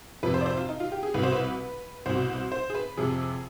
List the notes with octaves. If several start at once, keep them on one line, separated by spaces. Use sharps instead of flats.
F2 C3 F3 B4
C5
D5
C5
F4
D#4
F4
G4
G#4
C2 B2 B4 C5
B4
C2 B2 C5
C5
G#4
B4
F2 C3 F3 G#4